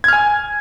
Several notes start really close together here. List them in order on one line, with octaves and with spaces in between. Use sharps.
G#6 F6 G#5